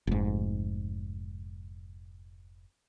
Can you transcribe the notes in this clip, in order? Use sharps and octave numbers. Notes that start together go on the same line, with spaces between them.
F1 G#2